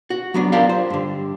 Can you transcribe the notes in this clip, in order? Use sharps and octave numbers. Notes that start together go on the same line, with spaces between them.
F#4
F#3 B3 D4
D4 F4 G4 A#4 D5 F5
C5
G2 D3